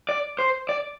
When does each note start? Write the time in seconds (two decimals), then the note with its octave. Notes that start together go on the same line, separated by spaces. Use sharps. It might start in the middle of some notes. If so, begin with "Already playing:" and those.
0.09 D5
0.39 C5
0.69 D5